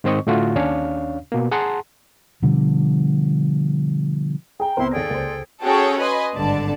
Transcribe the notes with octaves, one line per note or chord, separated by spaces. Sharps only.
G#2 D#3 C4 C5 D#5 C#6
A2 D3 A3 F4 F#4
D#2 C#4 D4 C#5 F5
B2 A#3
G#4 F#5 A5 A#5 C6
B2 D3 F3 G3
G#4 G5 A#5
C#2 B3 C4 E4 A#4 C5 C6
D#2 G#4 A4 D5 G5 A#6
C#2 A#3 C5
C#4 F#4 G#4 A4 C#5 G5
B4 D#5 G#5 C6
G#1 G2 D3 D5 A5